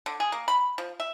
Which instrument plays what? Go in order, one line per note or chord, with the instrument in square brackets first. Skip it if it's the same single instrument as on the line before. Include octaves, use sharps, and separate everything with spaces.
[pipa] D3
G#4
A#3
B5
F3
E5